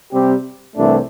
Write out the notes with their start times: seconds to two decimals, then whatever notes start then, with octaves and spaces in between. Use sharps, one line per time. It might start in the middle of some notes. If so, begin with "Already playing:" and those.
0.12 C3 G3 C4 G4
0.75 C2 C3 E3 A3 D4